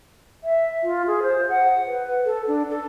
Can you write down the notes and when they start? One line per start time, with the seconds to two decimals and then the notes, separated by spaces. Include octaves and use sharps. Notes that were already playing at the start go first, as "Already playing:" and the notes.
0.44 E5
0.84 F4
1.07 G#4
1.23 C5
1.49 F#5
1.87 B4
2.25 A4
2.48 D4
2.70 A4